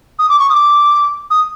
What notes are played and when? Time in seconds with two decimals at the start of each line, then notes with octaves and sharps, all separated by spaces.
0.19 D#6
0.29 D6
0.39 C#6
0.50 D#6
0.54 D6
1.30 D#6